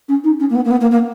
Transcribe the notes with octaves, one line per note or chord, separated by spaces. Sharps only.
C#4
D#4
C#4
A#3
B3
A#3
B3
A#3
A#3